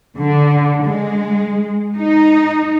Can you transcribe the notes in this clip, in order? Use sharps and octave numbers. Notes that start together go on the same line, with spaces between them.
D3
G#3
D#4